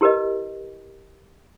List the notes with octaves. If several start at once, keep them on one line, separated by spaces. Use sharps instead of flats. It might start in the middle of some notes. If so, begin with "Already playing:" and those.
E4 G4 A#4 B4 D#5